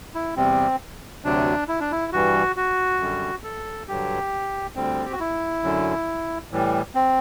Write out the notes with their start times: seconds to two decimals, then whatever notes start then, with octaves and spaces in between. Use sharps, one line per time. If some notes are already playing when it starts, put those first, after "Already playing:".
0.15 E4
0.36 E2 C3 G3 C4
1.25 D2 C3 F#3 D4
1.68 E4
1.80 D4
1.92 E4
2.12 G2 E3 G3 F#4
2.56 F#4
2.99 F#2 D3 G3
3.43 A4
3.88 G2 D3 F#3 G4
4.75 D2 D3 G3 C4
5.05 G4
5.12 F#4
5.20 E4
5.63 F#2 D3 F#3
6.51 A2 E3 G3
6.95 C4